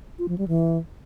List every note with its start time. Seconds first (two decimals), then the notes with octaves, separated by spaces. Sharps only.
0.19 F4
0.28 F3
0.38 G3
0.48 E3